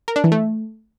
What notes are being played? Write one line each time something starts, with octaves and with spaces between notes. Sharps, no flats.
A#4
D4
E3
A3